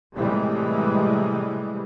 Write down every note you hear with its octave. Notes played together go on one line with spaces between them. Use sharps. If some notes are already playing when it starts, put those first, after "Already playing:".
A2 C3 E3 G3 G#3